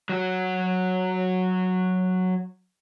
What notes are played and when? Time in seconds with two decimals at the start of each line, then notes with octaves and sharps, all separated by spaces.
0.09 F#3 F#4